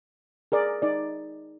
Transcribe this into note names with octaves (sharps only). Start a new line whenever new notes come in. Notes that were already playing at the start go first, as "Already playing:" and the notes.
G#4 A#4 D5
D#4 D5